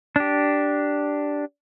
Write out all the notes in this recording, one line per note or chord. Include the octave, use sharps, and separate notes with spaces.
D4 G4